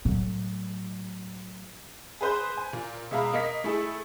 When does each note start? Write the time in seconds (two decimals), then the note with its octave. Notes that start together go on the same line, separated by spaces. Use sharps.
0.05 A2 F#3
2.21 G#4 B4 C5 F#6 G6
2.57 G#5
2.73 A#2
3.11 B2 G#3 E5 F5 A#5 B5
3.33 A#3 D#5 B6
3.64 A3 E4 G#4